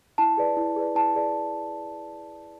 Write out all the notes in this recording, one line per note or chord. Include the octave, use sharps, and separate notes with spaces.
E4 A5
G#4 B4 D5
E4
G#4 B4 D5
E4 A5
G#4 B4 D5